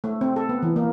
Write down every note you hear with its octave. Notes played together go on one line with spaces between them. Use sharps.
A3
C4
A4
B3
E3
A#3